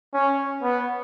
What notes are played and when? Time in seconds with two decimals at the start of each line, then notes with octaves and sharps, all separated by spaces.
0.14 C#4
0.63 B3